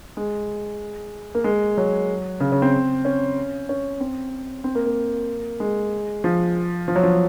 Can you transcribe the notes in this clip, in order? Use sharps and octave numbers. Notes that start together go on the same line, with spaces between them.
G#3
A#3
G#3
F#3
C#3
C#3
C4
C#4
C#4
C4
C4
A#3
A#3
G#3
F3
F3
F#3
F3